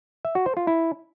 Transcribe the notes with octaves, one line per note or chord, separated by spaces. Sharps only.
E5
F#4
C5
F4
E4